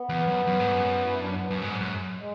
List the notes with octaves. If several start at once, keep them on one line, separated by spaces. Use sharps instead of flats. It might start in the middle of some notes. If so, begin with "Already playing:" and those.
Already playing: B3
E2
F#2
F#2
G#2
F#2
E4
D4
B3
F#2
G#2
F#2
G#3